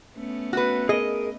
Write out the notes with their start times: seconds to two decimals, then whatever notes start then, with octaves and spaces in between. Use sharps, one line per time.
0.16 A3 B3 C#4
0.53 F#4 B4
0.89 G#4 A#4 D#5